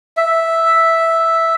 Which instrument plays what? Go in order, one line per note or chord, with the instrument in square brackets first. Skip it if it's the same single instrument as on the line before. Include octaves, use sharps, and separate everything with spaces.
[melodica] E5